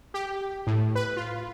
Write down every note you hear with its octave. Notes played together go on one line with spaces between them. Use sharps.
G4
A2
B4
F4